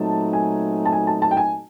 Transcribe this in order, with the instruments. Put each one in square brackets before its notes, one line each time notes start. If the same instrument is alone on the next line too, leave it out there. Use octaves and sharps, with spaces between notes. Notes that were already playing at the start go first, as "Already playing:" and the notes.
Already playing: [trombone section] A#2 F#3 A3 C4 D#4 [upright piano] A5
[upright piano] G#5
A5
G#5
A5
A5
G5
G#5